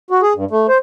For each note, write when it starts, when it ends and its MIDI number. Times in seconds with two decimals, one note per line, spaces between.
0.11 0.21 66
0.22 0.33 68
0.35 0.45 43
0.51 0.67 57
0.68 0.78 72